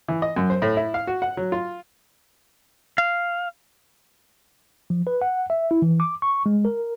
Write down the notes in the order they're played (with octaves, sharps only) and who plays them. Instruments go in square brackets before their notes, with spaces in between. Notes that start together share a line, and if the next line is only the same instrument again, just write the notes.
[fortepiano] E3
D#5
F#2
C5
A2
E4
F5
F#4
F#5
F#3
F4
[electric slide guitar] F5
[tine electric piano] F3
B4
F#5
E5
E4
E3
D6
C#6
G#3
A#4